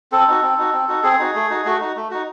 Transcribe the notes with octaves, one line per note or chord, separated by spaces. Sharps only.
C4 A4
D#4 F#4
C4
D#4 F#4
C4
D#4 F#4
C4 G#4
D#4 F#4
A3
D#4 F#4
A3 F#4
D#4 F#4
A3
D#4 F#4